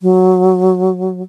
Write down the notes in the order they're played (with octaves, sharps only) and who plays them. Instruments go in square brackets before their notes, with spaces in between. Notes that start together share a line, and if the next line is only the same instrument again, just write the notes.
[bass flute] F#3